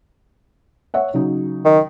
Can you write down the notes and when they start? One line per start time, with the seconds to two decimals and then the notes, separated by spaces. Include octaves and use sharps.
0.94 C#5 E5 F#5
1.14 C#3 F#3 D#4
1.65 D#3